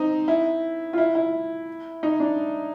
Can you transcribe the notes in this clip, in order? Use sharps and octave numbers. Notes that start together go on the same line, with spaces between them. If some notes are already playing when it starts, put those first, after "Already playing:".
Already playing: C4 D#4
E4
F4
E4
E4
D#4
D4